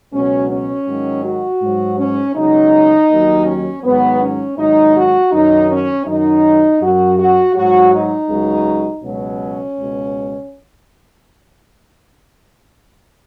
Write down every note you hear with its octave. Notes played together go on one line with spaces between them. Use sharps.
C#2 B2 F#3 C#4
C#4
G#2 D#3 F#3
F#4
G#2 F#3
C#4
C#2 C#3 F#3 D#4
D#2 D#3 F#3
C#4
G#2 D#3 F#3 B3
C#4
G#2 D#3 F#3 D#4
F#4
F#2 D#3 F#3 D#4
C#4
F#2 D#3 F#3 D#4
F#2 F#3 F#4
F#4
G#2 F#3 F#4
D#4
C#2 C#3 F#3
C#2 B2 F#3 C#4
C#2 B2